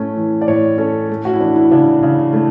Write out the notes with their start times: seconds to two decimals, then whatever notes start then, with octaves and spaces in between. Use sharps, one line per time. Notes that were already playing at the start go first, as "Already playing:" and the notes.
Already playing: A2 A3 C#4
0.16 E3
0.41 D5
0.48 A2 C#5
0.78 C#4 A4
1.09 A3
1.25 F#4
1.33 E4
1.40 E3 D4
1.56 E4
1.71 C#3 D4
2.03 C#3
2.33 A3 E4